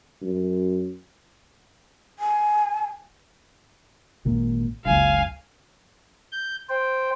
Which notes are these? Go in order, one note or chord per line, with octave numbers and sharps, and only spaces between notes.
F#2
G#5
G#1 A#2
F#1 C#2 F5 G#5
G6
C5 G5